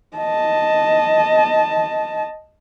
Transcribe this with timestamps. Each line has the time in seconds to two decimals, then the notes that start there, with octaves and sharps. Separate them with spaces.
0.17 D#5 A5